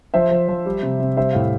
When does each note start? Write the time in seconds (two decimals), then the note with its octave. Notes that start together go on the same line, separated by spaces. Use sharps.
0.14 F3 C5 E5
0.31 F3
0.48 F3
0.66 G3
0.83 C3
1.00 C3
1.17 G3 C5 E5
1.32 A2 F5